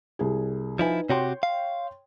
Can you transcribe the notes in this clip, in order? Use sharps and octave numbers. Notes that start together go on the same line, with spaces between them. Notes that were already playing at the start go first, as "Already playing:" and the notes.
C2 G3 G#4
F3 D#4 E4 B4 G#5
C3 F#4 G4 C#5 G5 C6
F5